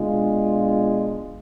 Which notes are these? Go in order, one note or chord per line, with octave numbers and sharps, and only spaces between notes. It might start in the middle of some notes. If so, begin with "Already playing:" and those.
Already playing: B2 G#3 D4 F4